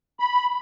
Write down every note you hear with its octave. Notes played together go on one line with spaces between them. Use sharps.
B5